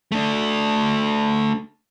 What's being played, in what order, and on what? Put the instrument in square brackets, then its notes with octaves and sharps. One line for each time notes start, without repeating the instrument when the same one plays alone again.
[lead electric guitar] A3 D4